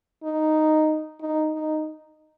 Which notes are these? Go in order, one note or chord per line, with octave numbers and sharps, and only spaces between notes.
D#4
D#4
D#4